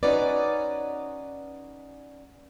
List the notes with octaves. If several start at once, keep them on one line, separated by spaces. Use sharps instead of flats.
C#4 D#4 F#4 B4 D5